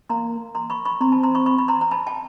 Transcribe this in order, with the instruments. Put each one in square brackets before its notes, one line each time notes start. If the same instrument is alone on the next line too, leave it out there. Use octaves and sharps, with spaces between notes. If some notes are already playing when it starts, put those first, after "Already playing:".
[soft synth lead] A#3 [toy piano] A#5 C6
[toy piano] A#5 C6
B5 C#6
B5 C#6
[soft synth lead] C4 [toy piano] A#5 C6
[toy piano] A5 B5
A#5 C6
B5 C#6
B5 C#6
B5
A#5 C6
A#5
A5 B5
G5 A5